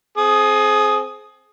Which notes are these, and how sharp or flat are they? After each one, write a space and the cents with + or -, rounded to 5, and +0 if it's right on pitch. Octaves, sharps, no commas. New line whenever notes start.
C4 +0 G#4 +30 D#6 +0